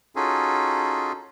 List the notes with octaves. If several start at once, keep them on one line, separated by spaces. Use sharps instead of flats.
C#4 D#4 F4 F#4 G#4 A4